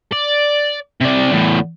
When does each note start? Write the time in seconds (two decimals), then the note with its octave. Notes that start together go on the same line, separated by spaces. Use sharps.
0.13 D5
1.01 C3 D5
1.32 E2 A2